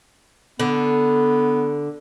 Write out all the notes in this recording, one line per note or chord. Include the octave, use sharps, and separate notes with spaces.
D3 B3